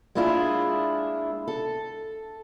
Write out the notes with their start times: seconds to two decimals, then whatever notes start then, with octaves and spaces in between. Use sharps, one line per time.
0.15 G#3 A#3 D4 E4 F4 G#4
1.48 A4